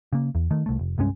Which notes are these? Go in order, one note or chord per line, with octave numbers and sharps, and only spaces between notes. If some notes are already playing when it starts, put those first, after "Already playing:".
C#3 A#3
E2
D#3 A3
C2 A3
F1
C2 G2 G#3 C#4